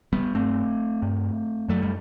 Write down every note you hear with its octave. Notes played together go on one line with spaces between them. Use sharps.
G3 B3
G2 A3 C4
G2
F#2 F#3 A3
G3